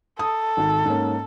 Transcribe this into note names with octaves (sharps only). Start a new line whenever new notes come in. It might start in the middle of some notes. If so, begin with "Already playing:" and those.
A4 D#6
G#1 G#2
G#2 A#3 C#4